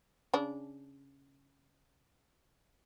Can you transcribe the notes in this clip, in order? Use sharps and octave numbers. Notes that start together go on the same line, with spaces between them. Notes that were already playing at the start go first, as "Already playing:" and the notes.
C#3 D4